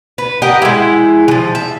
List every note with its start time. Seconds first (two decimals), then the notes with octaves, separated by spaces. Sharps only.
0.18 B4
0.42 G4 A#4 D#5 F#5
0.62 G#3 E4
1.28 E3 F3
1.55 E5